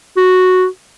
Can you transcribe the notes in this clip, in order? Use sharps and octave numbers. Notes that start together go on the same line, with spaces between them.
F#4